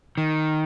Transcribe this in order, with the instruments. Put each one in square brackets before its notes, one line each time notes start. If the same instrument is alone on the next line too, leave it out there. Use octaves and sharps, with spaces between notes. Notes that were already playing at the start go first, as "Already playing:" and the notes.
[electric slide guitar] D#3